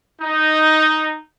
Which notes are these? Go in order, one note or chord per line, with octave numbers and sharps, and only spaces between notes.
D#4